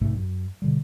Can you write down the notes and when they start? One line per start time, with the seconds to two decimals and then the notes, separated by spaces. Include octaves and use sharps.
0.01 A#1 G#2 C3 A3
0.15 F#2
0.62 B2 D3 G3